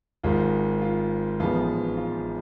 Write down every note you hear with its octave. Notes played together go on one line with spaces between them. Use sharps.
G#1 G#2 G#3 F4
F4
A1 G#2 F3 G#3 B3 F4
F4